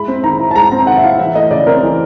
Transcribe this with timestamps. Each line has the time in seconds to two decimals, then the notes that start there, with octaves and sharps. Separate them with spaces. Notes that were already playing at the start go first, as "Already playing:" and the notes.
Already playing: G#3 E4 B5
0.08 C4
0.23 D#3 A#5
0.39 E4
0.51 A5
0.56 G#3 A#5
0.72 C4 A#5
0.87 D#3 F#5
0.97 E5
1.04 E4 F5
1.19 E3 E5
1.35 A3 D#5
1.51 C#3 D5
1.67 C4 A#4
1.83 E3